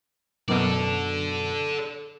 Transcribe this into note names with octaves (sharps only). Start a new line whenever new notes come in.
F#2 B2 A4 D5